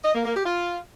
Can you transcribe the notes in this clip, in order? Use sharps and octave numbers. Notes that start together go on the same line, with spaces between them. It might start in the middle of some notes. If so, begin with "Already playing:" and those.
D#5
A#3
A#3
G4
F4